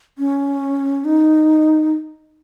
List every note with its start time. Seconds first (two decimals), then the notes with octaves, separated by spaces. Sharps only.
0.18 C#4
1.05 D#4